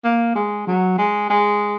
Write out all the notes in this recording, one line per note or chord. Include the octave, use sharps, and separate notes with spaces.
A#3
G#3
F#3
G#3
G#3